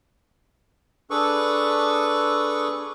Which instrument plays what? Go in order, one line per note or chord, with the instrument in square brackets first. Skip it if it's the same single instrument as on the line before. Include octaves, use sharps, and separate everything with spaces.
[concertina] D4 G#4 A4 B4 C#6